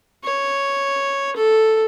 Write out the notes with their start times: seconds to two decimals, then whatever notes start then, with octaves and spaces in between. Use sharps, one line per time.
0.24 C#5
1.36 A4